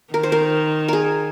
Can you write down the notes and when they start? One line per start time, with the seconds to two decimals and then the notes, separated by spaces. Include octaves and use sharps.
0.14 D#3 A#4
0.23 C5
0.32 A#4
0.88 G#4 A#4